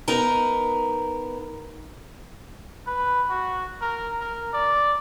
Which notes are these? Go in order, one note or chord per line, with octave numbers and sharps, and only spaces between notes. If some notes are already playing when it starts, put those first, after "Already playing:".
B3 D#4 A#4 A#5
B4
F#4
A#4
A#4
D5